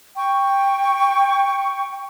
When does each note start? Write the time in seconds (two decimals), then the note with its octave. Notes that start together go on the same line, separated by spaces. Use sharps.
0.17 G5 C#6